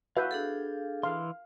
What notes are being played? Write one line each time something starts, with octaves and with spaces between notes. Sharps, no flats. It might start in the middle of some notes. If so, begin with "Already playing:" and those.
F#4 B4 E5 F5 G6
D4 G#4 A4
E3 F5 C6